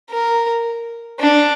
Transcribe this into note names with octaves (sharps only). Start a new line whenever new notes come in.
A#4
D4